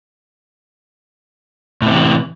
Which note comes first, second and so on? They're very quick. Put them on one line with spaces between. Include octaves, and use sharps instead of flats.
A2 C3 E3